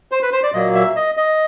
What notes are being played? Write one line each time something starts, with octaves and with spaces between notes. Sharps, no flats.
C5
B4
C5
D5
A#2 F#3 A#3 D#5
E5
D#5
D#5